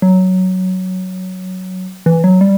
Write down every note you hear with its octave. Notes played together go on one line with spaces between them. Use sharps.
F#3
E3
F#3
G3